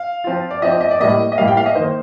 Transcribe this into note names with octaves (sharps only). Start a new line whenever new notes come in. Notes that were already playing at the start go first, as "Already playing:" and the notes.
Already playing: F5
F3 C4 F4
D5
F3 C4 F4 D#5
D#5
D5
A2 G3 A#3 D#5
D#5
A2 G3 A#3 F5
G5
F5
D#5
D#3 A#3 D#4 C5